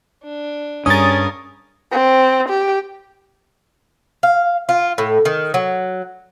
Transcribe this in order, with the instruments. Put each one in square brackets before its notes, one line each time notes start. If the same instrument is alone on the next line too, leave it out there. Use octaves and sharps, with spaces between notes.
[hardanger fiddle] D4
[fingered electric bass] G2 D4 [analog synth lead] C#4 [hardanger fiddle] G#4 A#4 [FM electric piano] D#6 A6
[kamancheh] C4
G4
[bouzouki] F5
F4
A2
D#3
F#3